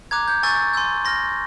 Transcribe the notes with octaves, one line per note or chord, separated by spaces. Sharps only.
A#5 D6 F#6 G#6
G6
G#5 C#6 E6 G6 A6
G#5 C6 E6 G6
C6 F6 A#6